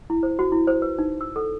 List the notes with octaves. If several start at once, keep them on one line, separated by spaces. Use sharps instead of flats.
E4
C5
F#4
E4
C5
B4
D#4
E6
A4